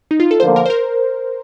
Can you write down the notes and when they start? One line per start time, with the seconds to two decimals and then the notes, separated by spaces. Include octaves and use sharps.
0.11 D#4
0.20 F4
0.31 A4
0.40 D3 F3 A#3 C5
0.56 A#4
0.65 C5
0.70 A#4